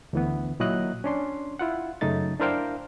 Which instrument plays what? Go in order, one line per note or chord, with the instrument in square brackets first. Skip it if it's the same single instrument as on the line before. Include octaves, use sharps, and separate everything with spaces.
[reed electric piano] D2 E3 B3
A#2 F#3 E4 D#5 F#6
C#4 D4 C6
E4 F4 F#5
F#2 C#3 A3 D#4 A6
D4 E4 A#4 C5 F5 G5